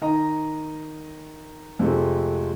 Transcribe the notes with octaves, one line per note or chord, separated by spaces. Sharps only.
D#3 D#5 A#5
F2 C3 G#3 A3